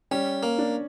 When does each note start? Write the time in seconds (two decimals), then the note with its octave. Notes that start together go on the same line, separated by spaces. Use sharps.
0.11 G3 C#4
0.43 A#3
0.58 D4